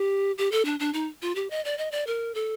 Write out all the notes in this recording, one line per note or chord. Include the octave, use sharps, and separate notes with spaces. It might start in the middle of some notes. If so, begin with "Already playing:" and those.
Already playing: G4
G4
A4
D4
D4
D#4
F4
G4
D#5
D5
D#5
D5
A#4
A4